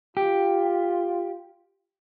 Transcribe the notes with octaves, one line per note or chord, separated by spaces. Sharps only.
F4 G4